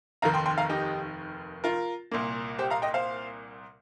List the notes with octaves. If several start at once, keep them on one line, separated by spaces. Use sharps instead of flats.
F1 D#2 D#3 F5 A#5
G5 C6
G5 C6
F5 A#5
D#4 G4
F4 A#4
C2 A#2 A#3
G4 C5
F5 A#5
D#5 G5
C5 F5